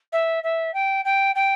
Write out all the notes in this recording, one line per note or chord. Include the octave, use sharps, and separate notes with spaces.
E5
E5
G5
G5
G5